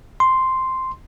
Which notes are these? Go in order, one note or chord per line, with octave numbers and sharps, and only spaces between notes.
C6